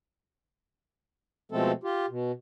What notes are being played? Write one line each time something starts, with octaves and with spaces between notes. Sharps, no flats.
B2 F3 G#3 A3 C4 A4
F4 G4
B2